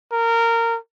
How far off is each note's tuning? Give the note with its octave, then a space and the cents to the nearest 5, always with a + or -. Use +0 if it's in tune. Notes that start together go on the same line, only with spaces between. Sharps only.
A#4 -20